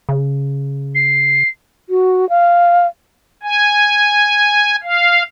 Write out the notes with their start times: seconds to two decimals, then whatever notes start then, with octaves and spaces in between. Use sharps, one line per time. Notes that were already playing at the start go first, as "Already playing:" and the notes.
0.09 C#3
0.95 C7
1.89 F#4
2.29 F5
3.43 G#5
4.83 F5